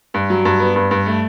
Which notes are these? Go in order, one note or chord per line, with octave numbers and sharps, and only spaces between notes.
G2
F#3
G2
B3
G2
G2
A3